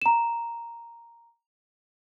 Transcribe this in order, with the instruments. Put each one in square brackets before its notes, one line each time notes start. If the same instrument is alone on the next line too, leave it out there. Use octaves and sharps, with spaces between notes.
[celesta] A#5 E7